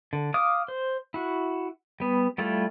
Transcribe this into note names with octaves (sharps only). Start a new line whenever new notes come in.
D3
F5 D6 D#6
C5
E4 F#4
G3 B3
G3 A3 E4 F4